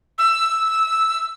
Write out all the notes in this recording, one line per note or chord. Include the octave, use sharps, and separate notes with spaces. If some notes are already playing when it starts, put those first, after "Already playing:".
E6